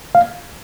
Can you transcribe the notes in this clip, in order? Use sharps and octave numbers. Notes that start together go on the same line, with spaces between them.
F5